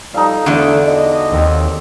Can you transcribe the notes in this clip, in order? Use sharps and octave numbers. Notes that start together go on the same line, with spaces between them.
F3 G3 D#4 A4 F5
E2 G#2 D3 A3 F#4 D5
B2 D#4 D#5
D#2 C4